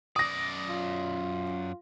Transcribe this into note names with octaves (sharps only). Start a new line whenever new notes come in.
F#2 D5 D#6 A#6
F4